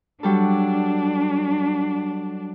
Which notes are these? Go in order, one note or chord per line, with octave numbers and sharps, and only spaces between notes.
F#3 G3 D4 A4